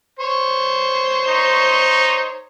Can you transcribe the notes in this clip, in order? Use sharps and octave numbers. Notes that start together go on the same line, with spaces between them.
C5 C#5
D#4